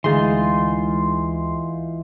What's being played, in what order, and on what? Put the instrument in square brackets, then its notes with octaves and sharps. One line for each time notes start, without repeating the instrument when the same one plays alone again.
[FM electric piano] D2 G#3 C6 [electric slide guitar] E3 D#4 F4